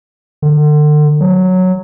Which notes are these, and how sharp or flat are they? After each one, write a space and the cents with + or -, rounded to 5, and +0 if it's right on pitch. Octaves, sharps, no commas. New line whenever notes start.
D3 +35
F#3 -5